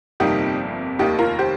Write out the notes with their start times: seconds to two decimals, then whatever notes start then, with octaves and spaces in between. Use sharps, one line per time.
0.20 G1 F2 C3 G3 A#3 D#4 G4
0.99 F1 D#2 D#3 A#3 D#4 G4
1.19 F4 A#4
1.39 G4 C5